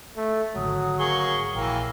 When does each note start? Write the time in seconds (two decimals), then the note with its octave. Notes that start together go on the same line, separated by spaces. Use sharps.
0.17 A3
0.56 G#1 D3 F#3 G#3 D#6
0.99 A#3 G#4 C#6 G7
1.55 A#1 E3 A#3 G5